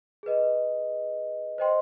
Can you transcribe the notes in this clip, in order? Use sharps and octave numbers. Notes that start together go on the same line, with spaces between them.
G#4 B4 D#5
C5 D#5 G5 C6